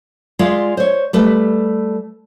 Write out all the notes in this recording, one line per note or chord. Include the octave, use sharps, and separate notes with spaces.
G#3 F4 D5 E5
C5 C#5
G3 A3 B4